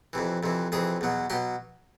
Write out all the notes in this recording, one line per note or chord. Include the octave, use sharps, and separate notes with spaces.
F2 C3 E3
F2 C3 E3
F2 C3 E3 G#4
E2 B2 F#3
B2 F#3 G4